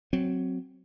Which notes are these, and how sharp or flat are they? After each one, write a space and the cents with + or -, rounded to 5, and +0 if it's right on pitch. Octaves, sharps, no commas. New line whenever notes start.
F#3 +0 C4 +0